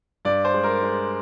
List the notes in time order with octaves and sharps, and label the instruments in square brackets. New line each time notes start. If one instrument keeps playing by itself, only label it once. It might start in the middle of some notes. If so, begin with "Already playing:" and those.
[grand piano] G2 D5
C5
G#3
A#4
G#3